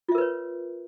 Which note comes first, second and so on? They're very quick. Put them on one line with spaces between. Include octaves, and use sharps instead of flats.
F4 E5 A#4 B4 C#5